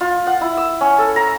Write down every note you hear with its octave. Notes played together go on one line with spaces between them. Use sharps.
F4
F#5
E4
E6
C#4
A4
A#5